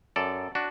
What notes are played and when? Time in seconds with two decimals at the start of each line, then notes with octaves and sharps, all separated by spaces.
0.16 F#2 A4 D5
0.55 D4 F#4